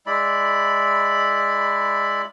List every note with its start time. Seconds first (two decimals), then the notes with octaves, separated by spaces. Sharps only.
0.06 G#3 E4 D5 B5